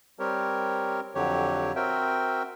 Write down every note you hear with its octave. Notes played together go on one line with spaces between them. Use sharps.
G3 C4 G4 A#4 C#5
F2 D3 F#3 G4 C#5
C4 F#4 A#4 E5 G5